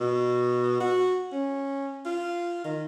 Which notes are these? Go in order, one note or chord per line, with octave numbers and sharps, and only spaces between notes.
B2
F#4
C#4
F4
D#3